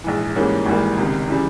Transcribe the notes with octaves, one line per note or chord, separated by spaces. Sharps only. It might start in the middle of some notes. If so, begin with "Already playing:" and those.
A#1 G#2 E3
G#2 E3 G3 A#3 C#4
G#1 G#2 E3 G3 A#3
C#2 C3 D#3
C#3 E3 G3